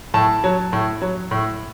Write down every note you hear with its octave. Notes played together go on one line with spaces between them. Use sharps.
A2 A5
F#3
A2
F#3
A2